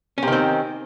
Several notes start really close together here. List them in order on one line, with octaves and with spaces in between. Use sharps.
C#4 C3 D#3 C4